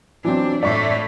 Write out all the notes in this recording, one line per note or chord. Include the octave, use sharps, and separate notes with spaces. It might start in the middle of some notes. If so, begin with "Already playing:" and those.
E3 F#3 C4 D4
A2 A3 D5 C#6 C7